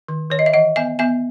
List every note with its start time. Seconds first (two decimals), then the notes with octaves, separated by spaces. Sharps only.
0.08 D#3
0.30 D#3 C#5
0.39 D#5
0.46 E5
0.53 E3 D#5 F#5
0.76 B3 E5 G#5
0.99 B3 E5 G#5